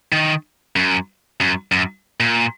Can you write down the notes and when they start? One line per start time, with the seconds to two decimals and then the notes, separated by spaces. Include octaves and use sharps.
0.12 D#3
0.76 F#2
1.41 F#2
1.72 F#2
2.20 A#2